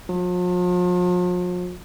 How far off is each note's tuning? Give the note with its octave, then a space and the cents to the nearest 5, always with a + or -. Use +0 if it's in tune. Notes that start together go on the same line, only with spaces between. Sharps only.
F3 +45